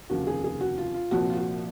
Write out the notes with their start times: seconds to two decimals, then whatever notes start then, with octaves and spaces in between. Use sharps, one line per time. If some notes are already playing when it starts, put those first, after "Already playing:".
0.10 F1 D#2 C#3 F3 F#4
0.27 G#4
0.44 G#4
0.61 F#4
0.78 F4
0.94 F4
1.11 C2 A#2 F3 F#4
1.30 F4
1.37 F#4